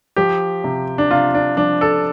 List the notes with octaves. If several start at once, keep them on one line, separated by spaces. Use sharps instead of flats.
F3 G4
C3
D4
C3 F4
D4
F3 D4
A4